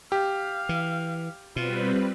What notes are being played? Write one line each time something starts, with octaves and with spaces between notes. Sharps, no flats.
G4 F5
E3
B2 G3 C4 F4 B4